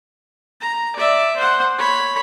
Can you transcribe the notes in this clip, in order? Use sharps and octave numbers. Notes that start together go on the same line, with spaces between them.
A#5
D5 E5
C5 F#5
C#5 B5